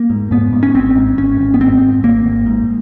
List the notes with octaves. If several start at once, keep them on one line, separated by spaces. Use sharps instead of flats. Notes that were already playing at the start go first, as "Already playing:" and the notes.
Already playing: A#3
G#2
G#2 B3
G#2
C#4
G#1 C4
G#2
G#1 C#4
G#1
B3
G#2 C4
G#2
G#1 A#3
G#1
G#2